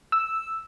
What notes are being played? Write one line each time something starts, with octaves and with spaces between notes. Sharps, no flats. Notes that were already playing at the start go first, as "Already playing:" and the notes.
E6